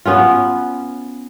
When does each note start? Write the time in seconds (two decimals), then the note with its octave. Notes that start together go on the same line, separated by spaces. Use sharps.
0.05 B3 C#4 F4